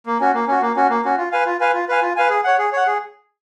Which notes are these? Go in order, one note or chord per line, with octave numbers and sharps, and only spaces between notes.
A#3
C#4 F#4
A#3
C#4 F#4
A#3
C#4 F#4
A#3
C#4 F#4
F4
B4 F5 G#5
F4
B4 F5 G#5
F4
B4 F5 G#5
F4
B4 F5 G#5
G#4
C#5 F#5
G#4
C#5 F#5
G#4